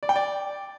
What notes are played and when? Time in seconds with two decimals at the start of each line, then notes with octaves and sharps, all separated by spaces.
0.03 D5
0.09 G5
0.16 D5